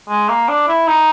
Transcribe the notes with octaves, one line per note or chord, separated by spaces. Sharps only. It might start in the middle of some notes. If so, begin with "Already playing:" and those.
G#3
A#3
D4
E4
D#4